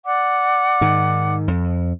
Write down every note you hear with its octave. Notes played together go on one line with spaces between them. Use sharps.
D5 F#5 D6
G#2 D#3
F2